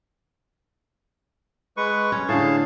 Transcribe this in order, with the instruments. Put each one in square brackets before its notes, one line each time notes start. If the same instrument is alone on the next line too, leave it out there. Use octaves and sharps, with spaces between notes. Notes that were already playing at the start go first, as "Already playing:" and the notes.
[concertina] G#3 B4 C#6
[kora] C#4
[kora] A2 D3 [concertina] G#4 F5 A5